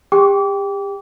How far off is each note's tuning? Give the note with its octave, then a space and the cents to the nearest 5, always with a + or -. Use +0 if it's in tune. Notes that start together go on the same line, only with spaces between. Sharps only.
G4 +35 G5 +0 D6 -30